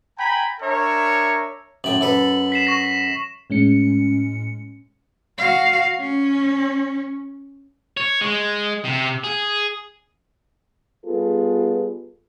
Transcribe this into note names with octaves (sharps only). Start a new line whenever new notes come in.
G5 G#5 A#5 B5
D4 A#4 C#5 E5
F#2 A2 G5 F#7
F#2 A4 B4
B6 C7 E7
C#6 A#6 E7
A2 G#3 C#4 C#7
F#4 F5
C#4
C#5
G#3
C3
G#4
G3 B3 F4 G#4 A4 B4